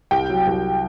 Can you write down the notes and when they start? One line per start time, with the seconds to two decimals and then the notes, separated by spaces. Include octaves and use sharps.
0.11 C2 G5
0.29 F#3
0.47 C2